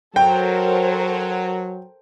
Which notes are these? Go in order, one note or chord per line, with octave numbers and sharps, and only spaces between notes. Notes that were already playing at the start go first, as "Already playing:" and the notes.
F#3 A4 A#4 C5 G5